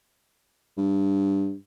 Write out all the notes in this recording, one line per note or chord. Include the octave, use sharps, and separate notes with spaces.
G2